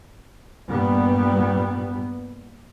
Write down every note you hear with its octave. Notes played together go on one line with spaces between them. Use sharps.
G2 A#2 G3 B3